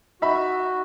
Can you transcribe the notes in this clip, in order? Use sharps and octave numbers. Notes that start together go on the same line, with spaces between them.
D#4 F#4 E5 B5